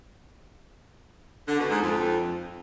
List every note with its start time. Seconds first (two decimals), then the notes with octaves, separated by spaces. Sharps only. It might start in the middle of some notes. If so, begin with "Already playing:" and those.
1.48 D3
1.59 B2
1.70 G#2
1.82 F2